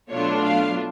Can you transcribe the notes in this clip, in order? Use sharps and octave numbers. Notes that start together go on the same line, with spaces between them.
B2 F#3 A3 D4 F4 C#5
F5